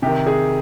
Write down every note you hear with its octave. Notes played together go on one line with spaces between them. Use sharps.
C3 D#3 G4
G#4